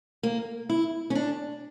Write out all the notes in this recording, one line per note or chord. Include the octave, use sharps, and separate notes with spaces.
A#3
E4
C#4
D4